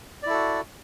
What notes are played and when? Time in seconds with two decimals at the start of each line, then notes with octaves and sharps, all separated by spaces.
0.23 D5
0.26 E4
0.30 A4
0.33 F#4